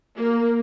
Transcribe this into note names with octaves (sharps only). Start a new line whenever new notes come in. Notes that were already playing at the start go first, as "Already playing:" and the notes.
A#3